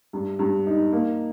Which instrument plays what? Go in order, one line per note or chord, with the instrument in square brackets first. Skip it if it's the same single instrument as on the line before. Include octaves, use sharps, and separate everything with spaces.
[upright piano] G2
G2
D#4
A#3